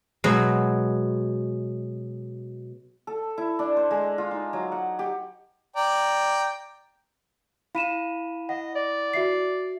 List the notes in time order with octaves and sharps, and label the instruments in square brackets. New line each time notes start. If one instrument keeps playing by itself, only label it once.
[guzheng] B2 F#3 G#3
[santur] A4
E4
D4
C5
G#3
F4
D#4
F#3
F#5
G4
[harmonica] D5 G5 A#5
[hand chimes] E4 B5 [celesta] F5 D#7 E7
[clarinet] D#5 [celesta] F#5
[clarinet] D5
[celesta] F#4 E5 C7